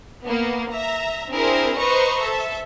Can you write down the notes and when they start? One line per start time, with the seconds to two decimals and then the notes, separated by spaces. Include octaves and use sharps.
0.23 A#3 B3
0.71 E5 A#5
1.30 C4 D4 E4 G#4 A#4 C5
1.78 B4 C5 D#5 A#5 C#6 C#7
2.21 A4 E5